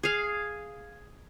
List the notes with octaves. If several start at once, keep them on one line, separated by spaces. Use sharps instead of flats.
G#4 F5